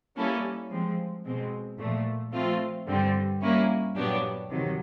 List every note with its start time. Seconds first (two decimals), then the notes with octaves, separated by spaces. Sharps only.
0.16 G3 A#3 C#4 E4 A4
0.70 F3 G#3 C4
1.25 B2 G#3 C4
1.78 A#2 F3 A3
2.33 F3 A3 C4 F4
2.87 G2 D3 G3 C4
3.41 G3 A#3 C#4 E4
3.95 A#2 F#3 B3 D4 G4
4.49 C3 D#3 F#3